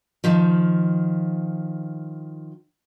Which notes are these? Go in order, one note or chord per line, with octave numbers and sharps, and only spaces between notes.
D#3 F3